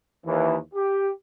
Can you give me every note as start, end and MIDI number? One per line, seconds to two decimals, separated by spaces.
0.25 0.57 39
0.25 0.57 52
0.74 1.09 67